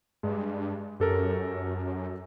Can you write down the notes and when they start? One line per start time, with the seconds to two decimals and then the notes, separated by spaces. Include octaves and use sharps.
0.23 G2 G#3
1.00 F#2 G4 A4 A#4